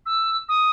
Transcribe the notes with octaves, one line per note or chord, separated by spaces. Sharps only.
E6
D#6